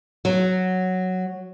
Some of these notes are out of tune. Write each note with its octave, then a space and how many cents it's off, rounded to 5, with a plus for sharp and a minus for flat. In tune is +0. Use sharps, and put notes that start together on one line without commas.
F#3 +0